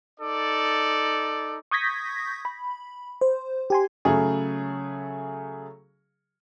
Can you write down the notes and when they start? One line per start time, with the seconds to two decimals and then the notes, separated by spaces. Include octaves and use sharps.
0.20 D#4 A4 D5
1.71 C#6 D#6 G6 G#6 A#6 B6
2.45 B5
3.21 C5
3.70 G4 G#5 C6
4.05 C#3 F#3 A3 G#4